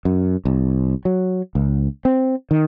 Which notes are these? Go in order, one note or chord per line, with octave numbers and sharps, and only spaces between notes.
F#2
C2
F#3
C#2
C4
D#3